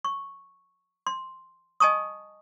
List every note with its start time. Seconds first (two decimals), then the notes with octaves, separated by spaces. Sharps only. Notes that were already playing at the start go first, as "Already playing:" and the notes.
0.05 C#6
1.07 C6
1.80 D#5 G#5 A5 C#6 D#6